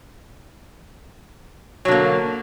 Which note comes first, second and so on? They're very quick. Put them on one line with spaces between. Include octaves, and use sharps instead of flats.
F#3 D3 A#3